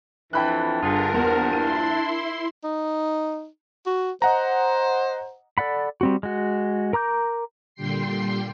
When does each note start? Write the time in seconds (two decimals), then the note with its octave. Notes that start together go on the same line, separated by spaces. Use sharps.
0.33 F2 E3 D4 G5 B5 F#6
0.83 G1 D3 F4 G#4 A#4
1.14 E2 G2 A#2 F3 C6
1.53 E4 C6 D#7
2.64 D#4
3.86 F#4
4.22 C5 D#5 F#5 A#5
5.58 A4 D5 F#5 B5
6.01 G3 C4 F#4
6.23 G#3 F#4
6.93 A#4 A#5 D6 G6
7.75 A#2 D3 G3 G5 C6 C7